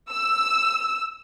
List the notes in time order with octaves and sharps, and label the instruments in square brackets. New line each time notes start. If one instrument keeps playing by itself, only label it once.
[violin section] E6